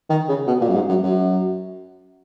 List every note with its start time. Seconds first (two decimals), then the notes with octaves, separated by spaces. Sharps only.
0.10 D#3
0.28 C#3
0.47 B2
0.61 A#2
0.68 F#2
0.75 G#2
0.89 F#2
1.03 F#2